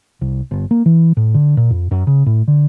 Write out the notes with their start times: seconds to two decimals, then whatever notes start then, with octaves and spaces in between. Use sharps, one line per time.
0.21 C2
0.51 G1
0.71 A#3
0.86 E3
1.17 A2
1.34 D3
1.57 A#2
1.70 F2
1.91 F#2
2.07 C#3
2.26 A2
2.48 D3